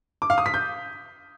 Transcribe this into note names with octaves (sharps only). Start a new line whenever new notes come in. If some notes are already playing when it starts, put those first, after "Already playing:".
D6
F5
D#6
B6
G6